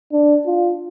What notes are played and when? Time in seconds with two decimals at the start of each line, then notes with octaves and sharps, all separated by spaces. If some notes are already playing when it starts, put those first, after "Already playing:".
0.12 D4
0.46 F4